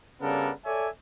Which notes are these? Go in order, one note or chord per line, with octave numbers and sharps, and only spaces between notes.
C#3 G3 B3 D4 A4 A#4
A4 C#5 D5 E5 G#5